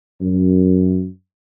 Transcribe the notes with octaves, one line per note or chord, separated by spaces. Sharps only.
F#2